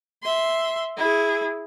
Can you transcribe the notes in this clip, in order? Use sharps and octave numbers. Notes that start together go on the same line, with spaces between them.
E5 C6
E4 G#4